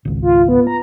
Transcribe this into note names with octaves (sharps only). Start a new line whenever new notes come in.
G#1 C#2
F4
B3
A#5